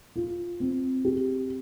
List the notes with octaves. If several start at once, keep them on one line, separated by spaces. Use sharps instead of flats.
F4
C4
G4